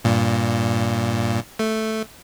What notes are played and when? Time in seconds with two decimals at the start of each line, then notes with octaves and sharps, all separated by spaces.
0.05 G2 A#2
1.59 A3